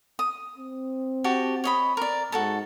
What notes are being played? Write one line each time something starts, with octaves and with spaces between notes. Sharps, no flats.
D#6
C4
F#4 G4 A5
C#5 D#5 B5
A#4 D5
G#2 F#4 A4 A5